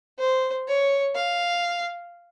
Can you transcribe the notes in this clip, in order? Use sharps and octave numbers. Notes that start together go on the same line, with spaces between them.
C5
C#5
F5